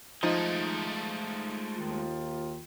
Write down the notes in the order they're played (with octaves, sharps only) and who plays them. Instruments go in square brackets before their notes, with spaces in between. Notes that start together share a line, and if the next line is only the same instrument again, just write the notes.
[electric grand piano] F3 [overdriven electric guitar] G#3 A3 [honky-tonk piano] D#4
[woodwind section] D#2 D#3 F4